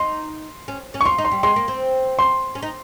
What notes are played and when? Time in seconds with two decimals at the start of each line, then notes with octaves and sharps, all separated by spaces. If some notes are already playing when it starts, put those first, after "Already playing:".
Already playing: D#4 C6
0.68 C#4
0.94 C#4
1.01 C#6
1.05 F4 C6
1.18 D#4
1.25 C6
1.32 G3
1.43 G#3 C6
1.56 A#3
1.68 C4
2.19 C6
2.55 C#4
2.62 D#4